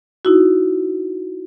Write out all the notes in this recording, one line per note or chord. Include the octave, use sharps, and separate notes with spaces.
D#4 E4 F#4